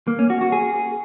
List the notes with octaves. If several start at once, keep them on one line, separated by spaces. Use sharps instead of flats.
A#3
C#4
F#4
F#4
G#4